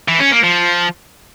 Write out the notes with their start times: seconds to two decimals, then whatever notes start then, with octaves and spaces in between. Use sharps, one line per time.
0.08 E3
0.20 C#4
0.32 A#3
0.44 F3